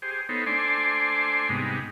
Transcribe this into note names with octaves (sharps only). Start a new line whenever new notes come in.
G4 G#4 C5
B3 D#4 A4 C5 C#5
A3 D4 C5 D5 G#5 C6
G#2 C3 G3 G#3 B3 D#4